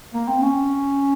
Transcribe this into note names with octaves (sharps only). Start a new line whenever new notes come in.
A#3
C4
C#4